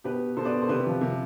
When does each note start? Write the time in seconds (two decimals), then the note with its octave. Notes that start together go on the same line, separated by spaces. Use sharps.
0.04 B2 G4 B4
0.37 B2 A4 C5
0.45 B4 D5
0.62 A4 C5
0.69 C3 G4 B4
0.86 F3
1.01 C3